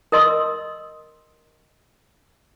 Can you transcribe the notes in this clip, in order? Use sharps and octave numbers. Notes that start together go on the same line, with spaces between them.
A#4 D#5 C6 D#6 E6